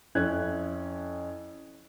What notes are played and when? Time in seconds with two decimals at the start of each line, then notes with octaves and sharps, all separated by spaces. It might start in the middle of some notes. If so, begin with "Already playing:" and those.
0.15 F2 C#4 E4 F#6 G#6